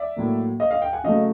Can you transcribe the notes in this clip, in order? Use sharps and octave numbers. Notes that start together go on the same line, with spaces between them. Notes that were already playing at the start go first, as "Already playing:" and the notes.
Already playing: D5 E5
A2 F#3 A#3
D#5 F5
D#5 F5
F5 G5
F#5 G#5
C#3 F#3 A3 D#5 F5